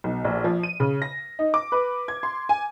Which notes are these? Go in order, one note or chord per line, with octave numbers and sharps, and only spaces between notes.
B1
A#1
F3
D#7
C#3
A#6
D#4
D6
B4
G#6
C6
G#5